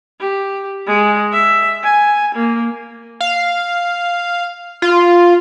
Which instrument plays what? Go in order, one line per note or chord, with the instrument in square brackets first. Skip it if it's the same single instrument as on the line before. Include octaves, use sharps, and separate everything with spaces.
[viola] G4
G#3
E5
G#5
A#3
[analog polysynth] F5
F4